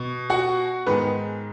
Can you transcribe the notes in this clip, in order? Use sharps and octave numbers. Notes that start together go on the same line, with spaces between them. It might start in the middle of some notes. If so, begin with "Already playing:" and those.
Already playing: B2
F#4 F#5
G#2 D#3 G#3 B3 B4